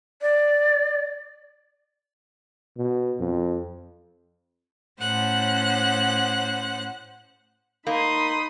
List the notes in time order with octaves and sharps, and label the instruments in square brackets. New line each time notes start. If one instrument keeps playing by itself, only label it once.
[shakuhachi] D5
[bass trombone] B2
F2
[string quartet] A2 C#4 C5 F#5 F#6
[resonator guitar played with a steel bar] A#3 [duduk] D#4 [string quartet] B5 C6 D#6